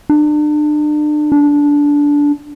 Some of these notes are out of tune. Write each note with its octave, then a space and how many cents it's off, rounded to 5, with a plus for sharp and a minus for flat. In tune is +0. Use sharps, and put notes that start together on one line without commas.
D4 +35
D4 -15